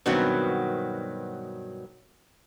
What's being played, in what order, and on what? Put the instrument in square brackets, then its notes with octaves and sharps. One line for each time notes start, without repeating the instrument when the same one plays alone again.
[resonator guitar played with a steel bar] G2 B2 D#3 F#3 B3 C4